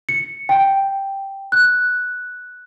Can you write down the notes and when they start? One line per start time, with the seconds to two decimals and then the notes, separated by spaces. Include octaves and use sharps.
0.09 C#7
0.49 G5
1.52 F#6